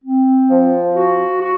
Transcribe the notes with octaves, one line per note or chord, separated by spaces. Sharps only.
C4
F3
F#4
F#4